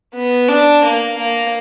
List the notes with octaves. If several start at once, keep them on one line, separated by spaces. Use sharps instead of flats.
B3
D4
A#3
A#3